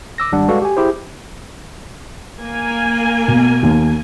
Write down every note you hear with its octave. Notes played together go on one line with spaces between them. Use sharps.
D6 E6 A#6
G#1 G3 D4 F#5
G#3 F#4 A4 B4 D5 F5
G4 G#5
E4 G4 G#4 C5
A#3 A#4 G#5
B2
D#2